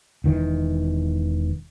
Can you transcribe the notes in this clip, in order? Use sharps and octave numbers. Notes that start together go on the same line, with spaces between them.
E1 D#3 E3